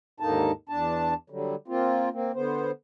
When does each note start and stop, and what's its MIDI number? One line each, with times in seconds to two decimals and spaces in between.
0.20 0.51 39
0.20 0.51 44
0.20 0.51 50
0.20 0.51 58
0.20 0.51 63
0.20 0.51 81
0.69 1.14 40
0.69 1.14 62
0.69 1.14 81
1.30 1.55 50
1.30 1.55 54
1.30 1.55 55
1.68 2.09 58
1.68 2.09 60
1.68 2.09 65
2.13 2.32 58
2.13 2.32 60
2.35 2.71 50
2.35 2.71 59
2.35 2.71 72